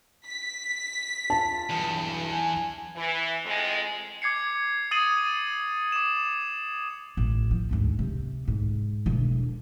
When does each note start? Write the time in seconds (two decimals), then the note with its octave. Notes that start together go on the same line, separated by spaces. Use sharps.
0.25 B6
1.30 F4 A5
1.70 B1 E2 G2
2.32 G#5
2.96 E3
3.45 F2 G#3
4.22 D6 G#6 C7 C#7
4.91 D#6 A6 C7 D#7 F#7
5.92 D6 E7
7.17 A1
7.51 F3
7.71 D2 G#2
7.99 C3
8.48 G#2
9.06 E1 D3